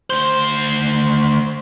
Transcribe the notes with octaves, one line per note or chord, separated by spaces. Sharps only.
D2 C5